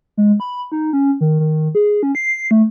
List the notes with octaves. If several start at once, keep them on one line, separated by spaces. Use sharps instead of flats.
G#3
B5
D#4
C#4
D#3
D#3
G#4
C#4
C7
A3